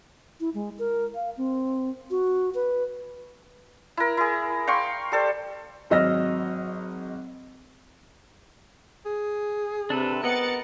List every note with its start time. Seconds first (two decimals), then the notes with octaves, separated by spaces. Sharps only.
0.40 E4
0.54 G#3
0.79 A#4
1.15 F5
1.37 C4
2.11 F#4
2.55 B4
3.97 E4 A#4
4.17 E4 G#4
4.67 F5 G5 C6 C#6
5.12 G3 A4 C5
5.90 G#1 F#3 D#5 E6 F6 A#6
9.06 G#4
9.90 C3 D4 A4 B4
10.24 B3 A#4 D#5 F#5 A6 C#7